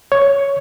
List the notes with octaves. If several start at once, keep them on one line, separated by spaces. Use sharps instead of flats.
C#5